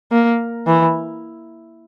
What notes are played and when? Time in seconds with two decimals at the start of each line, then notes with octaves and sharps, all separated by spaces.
0.11 A#3
0.67 E3